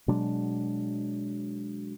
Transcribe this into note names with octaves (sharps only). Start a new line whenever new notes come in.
B2 F#3 G#3 D4